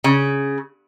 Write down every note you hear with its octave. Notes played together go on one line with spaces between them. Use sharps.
C#3